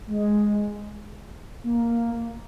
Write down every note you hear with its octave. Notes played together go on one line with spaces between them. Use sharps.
G#3
A#3